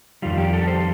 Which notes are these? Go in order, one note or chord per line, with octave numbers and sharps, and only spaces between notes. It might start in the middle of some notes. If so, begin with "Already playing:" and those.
F2 D#3 G3 F4
G4
A4
C5